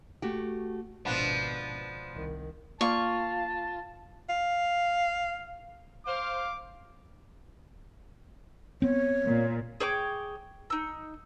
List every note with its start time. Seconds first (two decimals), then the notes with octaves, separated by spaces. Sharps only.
0.22 A3 F#4 G4
1.05 G#1 B2 F3 B3 D4
2.13 C2 D#3
2.81 A#3 F4 D5 A5 C#6
4.29 F5
6.06 C5 F5 D6
8.82 B3 C4 C#5
9.25 A#2
9.80 G#4 C#5 G5 D6
10.70 D#4 E6